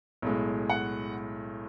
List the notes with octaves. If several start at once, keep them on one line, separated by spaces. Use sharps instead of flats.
B1 A2 G#3
F#5